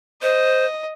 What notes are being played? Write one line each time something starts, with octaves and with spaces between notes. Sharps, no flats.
C5 D#5